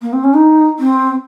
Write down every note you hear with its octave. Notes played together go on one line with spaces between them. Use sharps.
A#3
C4
C#4
D#4
C4